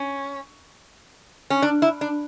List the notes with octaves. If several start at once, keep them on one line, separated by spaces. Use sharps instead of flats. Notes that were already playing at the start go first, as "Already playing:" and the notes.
Already playing: C#4
C#4
D4
E4
D4